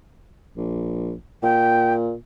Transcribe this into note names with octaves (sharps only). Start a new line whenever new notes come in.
A#1
A#2 G5